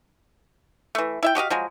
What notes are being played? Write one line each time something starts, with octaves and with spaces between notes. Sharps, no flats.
E3 A3
E4 E5 G5
F#4 G4 D#5 F5
F3 F#3 G#3